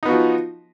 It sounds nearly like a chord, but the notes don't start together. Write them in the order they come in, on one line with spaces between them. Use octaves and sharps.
D#4 B3 F#4 F3